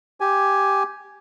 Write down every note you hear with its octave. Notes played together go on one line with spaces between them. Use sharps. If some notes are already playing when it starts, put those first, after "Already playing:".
G4 G#5